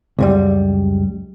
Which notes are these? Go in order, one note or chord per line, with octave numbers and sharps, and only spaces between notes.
C#2 F#2 G3